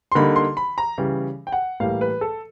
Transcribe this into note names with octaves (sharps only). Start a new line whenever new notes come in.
C6
D3 G3 A#3 D#4 B5
C6
B5
A#5
C#3 E3 G3
G5
F#5
A2 E3 G3 A#3 F5
B4
A4